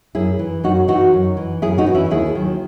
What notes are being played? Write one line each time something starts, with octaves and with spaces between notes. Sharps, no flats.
F#2 E4 G#4
E3
F#2 D#4 F#4
E3 D#4 F#4
F#2
E3
F#2 E4 G#4
D#4 F#4
E3
C#4 E4
D#2 E4 G#4
D#3 F#3